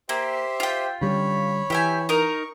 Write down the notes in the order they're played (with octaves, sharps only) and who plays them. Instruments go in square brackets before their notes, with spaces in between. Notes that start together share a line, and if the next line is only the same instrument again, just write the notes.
[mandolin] A#3 [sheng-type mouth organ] G4 C5 E5
[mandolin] F4 G5
[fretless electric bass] D3 G3 C#4 [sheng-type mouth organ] C#5 B5
[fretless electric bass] E3 [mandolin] G4 E5 G#5
[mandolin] D#4 A#4 [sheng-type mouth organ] C#6